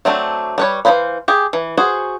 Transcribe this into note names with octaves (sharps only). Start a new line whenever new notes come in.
F#3 A3 C4 D4
G3 B4 C#5
E3 F#3 C5 F5 B5
G4 G#4
E3
F#4 G#4 C5